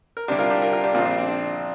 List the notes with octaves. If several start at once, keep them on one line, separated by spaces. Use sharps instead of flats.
A#4
C2 C3 D4 G4
F4 A#4
D4 G4
F4 A#4
F4 A#4
D4 G4
A#1 A#2 C4 F4
D4
C4
D4